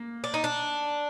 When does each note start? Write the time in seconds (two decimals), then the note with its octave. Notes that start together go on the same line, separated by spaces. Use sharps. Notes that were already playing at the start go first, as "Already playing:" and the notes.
Already playing: A#3
0.24 D4
0.34 D#4
0.44 D4